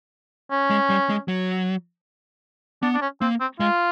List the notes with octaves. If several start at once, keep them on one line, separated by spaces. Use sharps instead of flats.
C#4
G#3
G3
G#3
F#3
B3 D4
D4
C#4
A#3 C4
C4
G#3 F4